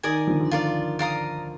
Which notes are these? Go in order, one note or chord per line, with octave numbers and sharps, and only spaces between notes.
D#3 A#4 D5 G#5 D#6
D3 F3
D3
F4 A#4 D5
D5 F5 A#5 D#6